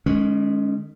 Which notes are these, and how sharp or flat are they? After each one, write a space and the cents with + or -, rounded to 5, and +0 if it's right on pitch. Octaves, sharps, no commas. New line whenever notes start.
D#3 -35 G#3 +15 C#4 +0